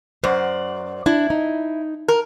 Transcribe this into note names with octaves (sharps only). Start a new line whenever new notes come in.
F#2 C5 D5 F#5
D4 E4
D#4
A#4